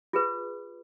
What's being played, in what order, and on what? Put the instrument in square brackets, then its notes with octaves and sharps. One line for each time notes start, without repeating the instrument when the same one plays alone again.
[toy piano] F4 G#4 B4